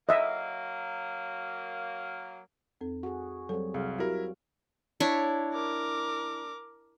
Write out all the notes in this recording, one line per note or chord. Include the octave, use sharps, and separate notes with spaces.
F#3 A#3 D#5 E5
F2 C4 A4
F#4 G#4
F#3 G3 C4 A4
C2 G#4 F5
F#3 E4 F#4 G4 A#4
D4 E4 C#5
A#4 D6